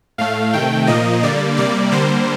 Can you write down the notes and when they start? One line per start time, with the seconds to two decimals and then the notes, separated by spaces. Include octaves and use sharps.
0.18 A2 A3 F5
0.53 C3 D#3 A3 G5
0.87 A#2 F3 A#3 D#5
1.23 D3 G3 A#3 D5
1.57 C3 G3 A#3 D5
1.92 D3 G3 A#3 C5